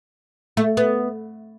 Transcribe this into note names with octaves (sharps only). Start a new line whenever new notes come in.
A3
B3